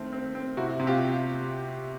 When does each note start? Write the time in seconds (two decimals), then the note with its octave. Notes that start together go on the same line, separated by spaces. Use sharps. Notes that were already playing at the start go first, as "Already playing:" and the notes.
Already playing: D#3 A3 C4
0.13 C4
0.35 C4
0.57 C3 E4 F#4
0.80 C3
0.87 F4 G4